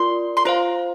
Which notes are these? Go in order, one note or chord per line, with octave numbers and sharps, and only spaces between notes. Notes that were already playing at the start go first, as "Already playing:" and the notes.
Already playing: F4 A#4 D5 C6
C6
F4 C5 F5 A#5